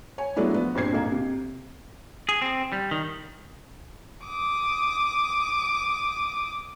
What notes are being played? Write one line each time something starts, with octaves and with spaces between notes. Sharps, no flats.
C#5 G#5
F#3 G#3 A3 B3 D4 E4
F3 B3
G2 A#2 C4 C5 G#6 C7
D#1 G#2 A#3
C3
G#4
C4
G3
D#3
D6 D#6